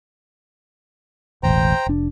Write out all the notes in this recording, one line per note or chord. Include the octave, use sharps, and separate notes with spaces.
E1 A1 C5 G5 A#5
F1 D4